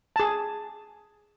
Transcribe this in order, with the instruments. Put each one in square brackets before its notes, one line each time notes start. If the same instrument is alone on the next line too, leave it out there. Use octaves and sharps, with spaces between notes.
[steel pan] G#4 A5